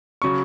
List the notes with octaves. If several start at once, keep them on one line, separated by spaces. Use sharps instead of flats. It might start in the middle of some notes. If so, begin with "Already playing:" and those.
C#3 F#3 C#6